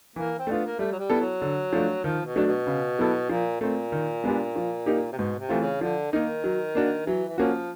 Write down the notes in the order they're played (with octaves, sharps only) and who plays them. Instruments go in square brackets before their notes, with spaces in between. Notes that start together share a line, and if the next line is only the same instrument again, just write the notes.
[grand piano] E3 [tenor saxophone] A#3
[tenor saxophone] C4
[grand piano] A3 D4 F4 [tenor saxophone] B3
[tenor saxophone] A#3
[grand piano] G3 [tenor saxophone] A3
[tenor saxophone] F#3
G3
[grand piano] B3 E4 A4
[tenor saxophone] F#3
[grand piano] D3
F3 A3 D4
[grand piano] D#3 [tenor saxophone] F3
[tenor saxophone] B2
[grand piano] F#3 A3 D4
[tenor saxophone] B2
[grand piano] C#3
F#3 B3 E4 A4
[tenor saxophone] A#2 [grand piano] F3
[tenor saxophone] A#2 [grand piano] A3 C4
[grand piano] D#3
G#3 B3 D4 G4
F3
A#3 D#4 G4
[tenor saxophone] C3
[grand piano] G#2 [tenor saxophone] B2
[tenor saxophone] C3
[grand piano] E3 A3 C4 F4
[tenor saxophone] C#3
[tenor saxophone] D3 [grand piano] F3
[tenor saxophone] D#3 [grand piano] A#3 D#4
[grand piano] F#3
A#3 D4 F#4
[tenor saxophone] E3 [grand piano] F#3
[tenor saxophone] E3
[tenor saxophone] F3 [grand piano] A#3 C#4 F#4